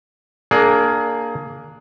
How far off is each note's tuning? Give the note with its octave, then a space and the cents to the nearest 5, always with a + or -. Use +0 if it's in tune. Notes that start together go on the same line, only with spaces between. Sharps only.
A#3 -5 D4 +5 G#4 +25